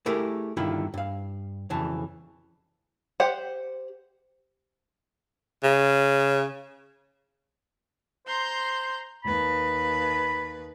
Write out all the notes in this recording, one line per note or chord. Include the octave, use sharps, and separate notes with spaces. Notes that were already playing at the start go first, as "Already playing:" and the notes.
A3 E4 G4 G#4 A#4
B1 G2 D3 D#3 E4 F4
G2 F5
B1 F2 C#3 E3 A5
G4 C5 F#5
C#3
C5 A#5 C6 G6
D#2 B4 B5